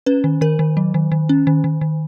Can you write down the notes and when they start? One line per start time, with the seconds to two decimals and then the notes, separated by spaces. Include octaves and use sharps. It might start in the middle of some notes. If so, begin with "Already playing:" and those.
0.06 C#4 B4
0.24 D#3
0.41 D#3 A#4
0.59 D#3
0.77 F#3
0.94 D#3
1.12 D#3
1.29 C#4
1.47 D#3
1.64 D#3
1.81 D#3